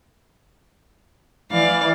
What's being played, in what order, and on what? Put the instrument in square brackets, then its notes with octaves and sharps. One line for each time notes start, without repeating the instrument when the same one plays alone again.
[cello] E3 [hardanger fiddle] D5 F5